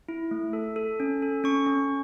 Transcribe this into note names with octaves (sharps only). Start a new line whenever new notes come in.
E4
A3
A4
A4
C#4
A4
C#4 C#6
C#4